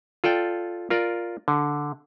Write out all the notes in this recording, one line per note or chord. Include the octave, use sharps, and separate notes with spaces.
F4 A4 D5 G5
F4 A#4 D5
D3